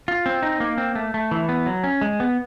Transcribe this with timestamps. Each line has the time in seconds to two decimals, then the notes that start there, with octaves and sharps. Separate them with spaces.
0.08 F4
0.26 C4
0.43 D#4
0.60 A#3
0.78 C4
0.95 A3
1.14 A3
1.31 E3
1.49 B3
1.66 F#3
1.84 C#4
2.01 G#3
2.20 B3